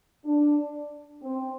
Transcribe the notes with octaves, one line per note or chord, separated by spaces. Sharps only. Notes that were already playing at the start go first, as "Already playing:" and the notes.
D4
C4